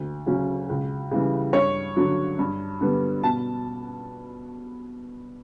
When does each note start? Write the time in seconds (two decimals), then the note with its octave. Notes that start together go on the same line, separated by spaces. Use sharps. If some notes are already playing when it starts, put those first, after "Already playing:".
Already playing: D2
0.26 C#3 F#3 C#4
0.69 C#2
1.11 C#3 E3 G3
1.53 G2 C#5
1.97 D3 F#3
2.39 G2
2.81 D3 G3 B3
3.23 B2 A5